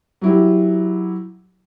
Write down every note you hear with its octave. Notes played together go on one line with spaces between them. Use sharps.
F#3 E4 G4